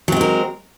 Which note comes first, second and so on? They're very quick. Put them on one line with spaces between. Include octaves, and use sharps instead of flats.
F#3 C4 G#3 A#4